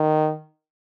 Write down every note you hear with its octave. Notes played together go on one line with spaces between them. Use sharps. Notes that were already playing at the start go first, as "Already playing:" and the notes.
Already playing: D#3